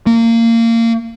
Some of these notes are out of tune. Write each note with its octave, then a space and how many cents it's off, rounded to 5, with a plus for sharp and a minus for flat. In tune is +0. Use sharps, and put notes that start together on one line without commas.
A#3 -25